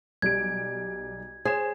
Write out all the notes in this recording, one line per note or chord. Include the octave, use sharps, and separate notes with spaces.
B1 G3 G#6 D7
G#4 C5 C#5 E7